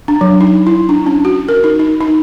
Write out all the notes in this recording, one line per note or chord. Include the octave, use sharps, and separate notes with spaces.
D4
F#3
D#4
E4
D4
C#4
F#4
A#4
D#4
D#4
D#4